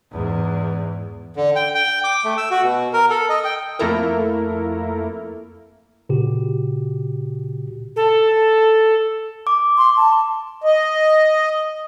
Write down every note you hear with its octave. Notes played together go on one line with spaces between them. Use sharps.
E2 G#2
D3
G5
G5
D6
A3
E6
F#4
B2
A#4
A4
D#5
G5
F2 A3 A#3 E4 A4 A#4
A#2 C#3 F#4 G4
A4
D6
C6
A5
D#5